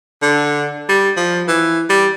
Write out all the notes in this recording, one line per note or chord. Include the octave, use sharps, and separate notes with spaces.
D3
G3
F3
E3
G3